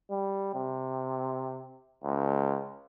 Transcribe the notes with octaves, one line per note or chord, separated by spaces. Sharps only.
G3
C3
C#2